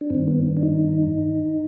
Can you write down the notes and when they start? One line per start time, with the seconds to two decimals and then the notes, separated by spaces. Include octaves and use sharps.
0.01 D4
0.10 G2 D#3 C4
0.28 B3
0.57 D4
0.63 D#4